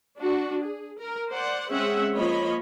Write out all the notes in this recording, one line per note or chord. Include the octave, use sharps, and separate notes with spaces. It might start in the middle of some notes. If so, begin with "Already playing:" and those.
D4 F#4
G#4
A#4
C5 D5 F#5
G#3 C4 C#4 G#4 E5 F#5
F3 A#3 C#5 D#5 B5